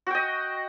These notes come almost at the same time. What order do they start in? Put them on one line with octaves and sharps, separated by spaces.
F#4 G5 D#5